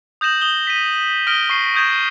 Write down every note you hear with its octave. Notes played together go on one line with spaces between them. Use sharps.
D#6 G6 A#6 E7 F#7
D#6 G7
B6 D#7
D#6 F6 A#6 D7 G7
C#6 C7
C#6 D#6 G6 G#6 E7